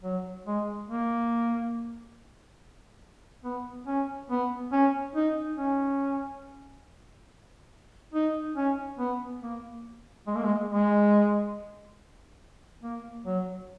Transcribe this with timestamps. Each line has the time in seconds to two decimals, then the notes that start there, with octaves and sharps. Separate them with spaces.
0.03 F#3
0.46 G#3
0.88 A#3
3.44 B3
3.87 C#4
4.30 B3
4.72 C#4
5.15 D#4
5.57 C#4
8.14 D#4
8.56 C#4
8.99 B3
9.42 A#3
10.27 G#3
10.35 A#3
10.44 G#3
10.69 G#3
12.83 A#3
13.25 F#3